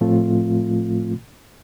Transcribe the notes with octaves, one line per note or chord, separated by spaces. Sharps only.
A2 F3 A3 C4 F4